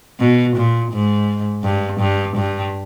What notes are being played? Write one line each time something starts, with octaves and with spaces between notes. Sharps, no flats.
B2
A#2
G#2
G2
G2
G2